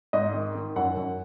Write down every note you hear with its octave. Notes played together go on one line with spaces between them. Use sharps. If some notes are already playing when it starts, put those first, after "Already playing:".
G#2 D#5
D#3
D#3
F#2 F#5
F#2